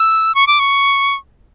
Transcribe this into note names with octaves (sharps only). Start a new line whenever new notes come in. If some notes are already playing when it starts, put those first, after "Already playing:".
Already playing: E6
C#6
D6
C#6